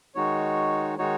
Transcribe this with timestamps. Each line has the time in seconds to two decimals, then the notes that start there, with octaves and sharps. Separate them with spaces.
0.15 D#3 G#3 D#4 F#4 C#5
0.98 D#3 G#3 D#4 F#4 C#5